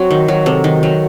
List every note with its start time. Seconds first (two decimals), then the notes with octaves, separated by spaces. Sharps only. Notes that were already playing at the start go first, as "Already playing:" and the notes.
Already playing: F#3 C4 F#4
0.11 D#3
0.28 F#3
0.46 C3 A4
0.64 D#3
0.83 F#3